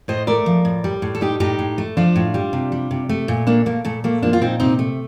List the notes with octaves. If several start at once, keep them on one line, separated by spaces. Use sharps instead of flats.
A2 C5 D#5
A3 A#4 D5
F3
A2
G3
A2
A4
G3 D#4 G4
A2 D#4 G4
A2
A3
F3 D4 F4
A2
G3
C3
G3
C3
A3
A#2
A3 A#3 D4
A#2 A#3
A#2 A3
A3 A#3
F3 A#3 D4
F4
A#2 C4 D#4
C3 C4 D#4
A3